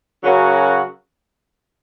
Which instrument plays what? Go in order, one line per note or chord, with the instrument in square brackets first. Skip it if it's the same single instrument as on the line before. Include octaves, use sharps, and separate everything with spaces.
[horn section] C#3 F#3 C#4 F#4 A#4